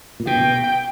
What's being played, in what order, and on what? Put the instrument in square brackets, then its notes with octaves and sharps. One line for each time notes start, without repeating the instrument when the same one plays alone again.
[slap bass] A#2
[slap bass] B2 [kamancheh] G5